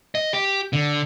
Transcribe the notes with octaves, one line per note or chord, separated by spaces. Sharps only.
D#5
G4
D3